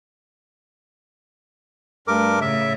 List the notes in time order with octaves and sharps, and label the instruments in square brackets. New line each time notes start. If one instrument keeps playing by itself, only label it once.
[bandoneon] G2 A#4 D6 [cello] A3
[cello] A2 C#3 [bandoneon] E5